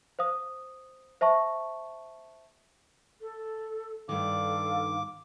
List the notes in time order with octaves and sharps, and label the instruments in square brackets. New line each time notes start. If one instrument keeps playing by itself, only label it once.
[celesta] C5 F5 D#6
C5 E5 A5 C#6
[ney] A4
[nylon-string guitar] G2 D#3 [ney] A4 [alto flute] F5 [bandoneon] D6